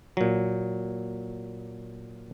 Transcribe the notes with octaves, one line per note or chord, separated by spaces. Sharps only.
A#2 F#3